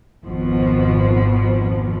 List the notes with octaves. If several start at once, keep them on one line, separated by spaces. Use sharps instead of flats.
G#1 F2 B2 F3